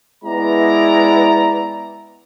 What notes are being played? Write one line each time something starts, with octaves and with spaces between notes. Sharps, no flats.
G#3 B3 E4 D5 A#5